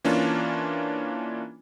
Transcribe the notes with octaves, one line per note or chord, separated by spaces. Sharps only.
E3 A#3 C#4 D4 F4